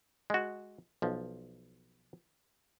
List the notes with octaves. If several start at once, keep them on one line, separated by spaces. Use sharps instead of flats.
G#3 F#4
B1 F3